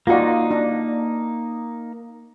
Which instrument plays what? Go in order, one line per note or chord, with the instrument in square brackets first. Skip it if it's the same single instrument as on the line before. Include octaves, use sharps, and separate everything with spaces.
[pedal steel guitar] A#3 D#4 [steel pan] F4 F#4 D5
[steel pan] D4